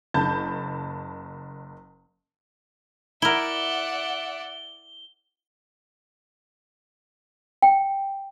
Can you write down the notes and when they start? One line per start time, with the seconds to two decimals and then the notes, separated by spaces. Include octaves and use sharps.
0.14 F#1 A5 B5 G6
3.22 E4 A#4 D5 E5 F#5 G7
7.62 G5